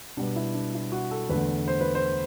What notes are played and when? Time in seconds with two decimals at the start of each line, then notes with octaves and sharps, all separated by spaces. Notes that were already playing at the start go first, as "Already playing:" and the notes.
0.17 B2 G3 B3 D4
0.36 E4
0.54 D4
0.74 E4
0.92 F#4
1.11 A4
1.30 E2 D3 A3 B4
1.68 C5
1.81 B4
1.95 C5